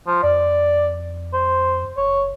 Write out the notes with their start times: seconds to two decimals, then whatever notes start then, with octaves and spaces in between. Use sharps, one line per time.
0.07 F3
0.23 F2 D5
1.33 C5
1.97 F#1 C#5